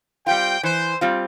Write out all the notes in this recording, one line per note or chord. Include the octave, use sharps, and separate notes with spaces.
G3 C4 F4 G5
E3 C5
G3 C4 F4